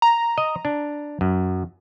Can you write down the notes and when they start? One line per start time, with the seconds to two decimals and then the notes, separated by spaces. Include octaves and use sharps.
0.02 A#5
0.38 D#5
0.65 D4
1.21 F#2